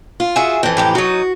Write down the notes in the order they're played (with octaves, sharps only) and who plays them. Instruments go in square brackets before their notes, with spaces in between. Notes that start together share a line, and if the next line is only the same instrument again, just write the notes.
[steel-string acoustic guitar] F4
[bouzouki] F#4 G#4 E5
[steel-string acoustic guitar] F2 E3 [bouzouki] G5
[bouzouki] A2 G4 A#5
[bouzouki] F#3 D#4 [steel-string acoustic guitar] F#4